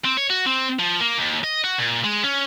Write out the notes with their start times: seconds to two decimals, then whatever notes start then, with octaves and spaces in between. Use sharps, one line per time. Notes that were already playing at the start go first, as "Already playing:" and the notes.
0.05 C4
0.17 C#5
0.30 F#4
0.46 C4
0.79 F3
1.01 A#3
1.18 D#2
1.44 D#5
1.64 F#4
1.79 A#2
2.05 G#3
2.24 C#4